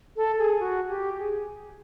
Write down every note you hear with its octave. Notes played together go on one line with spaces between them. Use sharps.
A4
G#4
F#4
G4
G#4